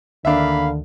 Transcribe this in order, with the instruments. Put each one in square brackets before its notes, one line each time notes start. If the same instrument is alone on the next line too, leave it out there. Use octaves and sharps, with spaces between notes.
[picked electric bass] D2 D#3 [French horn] D3 [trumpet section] A#3 F5 B5 [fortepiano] D4 E5